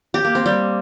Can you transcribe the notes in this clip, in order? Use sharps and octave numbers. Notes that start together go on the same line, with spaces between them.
G4
A#3
C4
G3